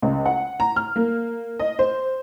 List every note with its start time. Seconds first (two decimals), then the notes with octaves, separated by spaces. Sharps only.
0.02 C#2
0.26 F#5
0.60 A#5
0.76 F6
0.96 A#3
1.59 D#5
1.79 C5